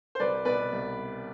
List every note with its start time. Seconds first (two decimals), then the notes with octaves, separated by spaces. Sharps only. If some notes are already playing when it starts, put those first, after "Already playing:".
0.15 C5
0.20 C2 B4 D5
0.45 B2 B3 B4 D5
0.72 C2